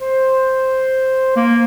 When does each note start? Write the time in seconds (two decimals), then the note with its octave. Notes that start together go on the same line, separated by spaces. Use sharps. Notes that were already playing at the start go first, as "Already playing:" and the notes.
0.01 C5
1.36 A#3